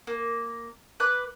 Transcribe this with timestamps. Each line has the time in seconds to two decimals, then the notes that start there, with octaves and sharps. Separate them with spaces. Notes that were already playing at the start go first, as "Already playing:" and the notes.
0.07 A#3
1.00 B4 B5 D6 F#6